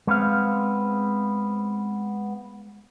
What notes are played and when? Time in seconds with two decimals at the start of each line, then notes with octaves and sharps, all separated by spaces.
0.07 G#3 B3 C4 F5